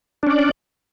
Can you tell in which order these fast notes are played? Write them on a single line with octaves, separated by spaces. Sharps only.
D4 C#4 D5